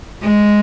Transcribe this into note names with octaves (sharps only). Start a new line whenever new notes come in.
G#3